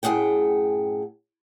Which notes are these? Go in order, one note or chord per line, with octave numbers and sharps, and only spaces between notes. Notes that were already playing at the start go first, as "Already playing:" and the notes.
F#2 A2 G#4 F#5 G5